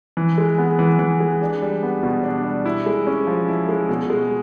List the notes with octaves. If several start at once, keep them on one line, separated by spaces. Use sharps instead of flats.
E3
G#3
B3
E3
E3
G#3
D4
G3
B3
B2
D4
G3
E4
G#3
C#4
F3
E4
G#3
B2
G#3